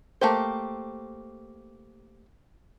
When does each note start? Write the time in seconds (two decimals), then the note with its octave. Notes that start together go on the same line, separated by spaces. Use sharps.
0.21 A3 A#3 G4 C5